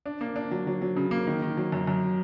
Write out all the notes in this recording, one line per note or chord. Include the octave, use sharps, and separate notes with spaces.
D4
A#3
D4
F#3
F#3
F#3
C#3
A#3
D#3
D#3
F#3
F#2
F#2